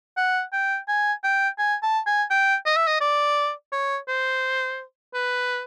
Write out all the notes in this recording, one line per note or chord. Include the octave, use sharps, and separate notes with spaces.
F#5
G5
G#5
G5
G#5
A5
G#5
G5
D#5
E5
D#5
D5
C#5
C5
B4